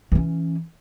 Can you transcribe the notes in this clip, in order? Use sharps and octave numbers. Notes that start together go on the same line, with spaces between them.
E3 C#4